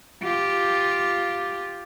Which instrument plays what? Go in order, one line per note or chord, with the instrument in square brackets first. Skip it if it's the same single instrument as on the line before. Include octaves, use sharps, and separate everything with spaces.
[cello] F4 G4